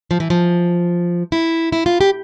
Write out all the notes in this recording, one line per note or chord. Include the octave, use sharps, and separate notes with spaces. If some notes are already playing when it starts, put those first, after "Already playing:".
F3
E3
F3
E4
E4
F4
G4